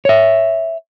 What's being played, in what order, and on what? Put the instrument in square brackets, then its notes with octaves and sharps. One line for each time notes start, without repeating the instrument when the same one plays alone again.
[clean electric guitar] C#5 E5